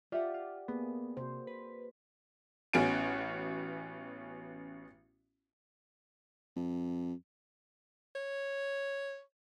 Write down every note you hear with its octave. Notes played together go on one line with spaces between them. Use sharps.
F4 G4 D5 E5 F#5
F4
A#3 B3 G#4
C3 F#4 C5
B4
A1 B3 C#4 F#4 G#5 D7
F2
C#5